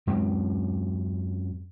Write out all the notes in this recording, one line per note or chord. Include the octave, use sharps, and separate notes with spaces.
F#2 G#3 C4